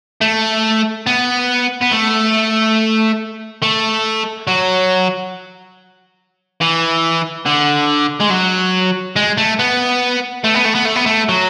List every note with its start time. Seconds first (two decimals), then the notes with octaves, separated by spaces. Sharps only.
0.21 A3
1.06 B3
1.81 B3
1.91 A3
3.62 A3
4.48 F#3
6.61 E3
7.46 D3
8.20 G#3
8.30 F#3
9.16 G#3
9.37 A3
9.59 B3
10.44 A3
10.55 B3
10.65 A3
10.75 B3
10.85 A3
10.96 B3
11.06 A3
11.29 F#3